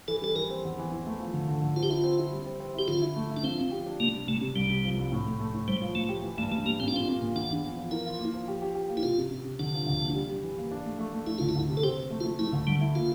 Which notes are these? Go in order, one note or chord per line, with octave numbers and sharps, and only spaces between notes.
E3 A4
G3 A4
E3 A#4
C4
E2
E3
E3
A3
F3
D3
D3
D3
C4 F4
G4
E4 F4
C4
E4
G3
C4
C4
E4 G4
D3 F4
E4
A3
E4
D4
F3 C4
F3
G4
D4
C3 A#3
G3
C3 A3
C3
C2 G3
C3
F3
C2
A2
A3
A3
A2
G3 C5
F3
F3 A3
G4
E3
G2 A3
G2 A3
G3 A#3
A#2 C4
D4
C4 F4
A#3
A#2
E2 D4
E2
F3
F3
E4 A#4
F4
A#3
F3
G4
G4
G4
A#3
E4
C3 F4
C3
C3
C3
D3 D4
F3
D2
A#3
G3
G3
E3
A#3
D4
A3
A3
A3
A3 E4
D2 F4
E4
D2
C3
A4
C4 G4
C4
A3
F4
A3
A3 E4
D2
D3 G3
E4
A#3 F4